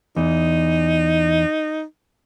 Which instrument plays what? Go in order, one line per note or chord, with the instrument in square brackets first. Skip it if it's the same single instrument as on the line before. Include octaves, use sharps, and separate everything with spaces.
[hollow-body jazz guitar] E2 [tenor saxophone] D#4